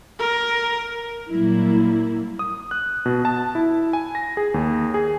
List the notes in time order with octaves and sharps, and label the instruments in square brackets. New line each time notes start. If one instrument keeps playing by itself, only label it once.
[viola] A#4
[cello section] A#2 F#3 G3 A#3 E4
[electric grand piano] D#6
F#6
B2
A5
E4
G#5
A#6
G#4
D#2
G#4